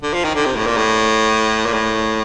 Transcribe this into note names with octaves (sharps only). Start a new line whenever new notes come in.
D3
F3
D#3
D3
C3
A2
A#2
A2
A#2
A2